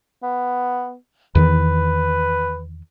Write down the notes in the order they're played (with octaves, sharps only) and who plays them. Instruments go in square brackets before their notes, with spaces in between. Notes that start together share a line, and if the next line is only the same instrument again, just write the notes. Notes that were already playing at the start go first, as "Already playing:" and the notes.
[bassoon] B3
[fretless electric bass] E2 D#3 E3 [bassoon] B4